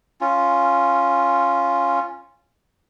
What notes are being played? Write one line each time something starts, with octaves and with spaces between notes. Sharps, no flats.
C#4 F4